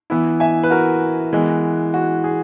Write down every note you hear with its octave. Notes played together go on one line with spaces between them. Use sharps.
E3 B3 E4
E5 G#5
B4
F#4 A#4
E3 G#3 B3
F#4
G#4